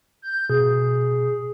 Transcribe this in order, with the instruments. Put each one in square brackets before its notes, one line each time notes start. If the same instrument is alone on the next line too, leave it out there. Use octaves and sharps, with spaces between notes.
[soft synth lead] G6
[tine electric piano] B2 [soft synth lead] G#4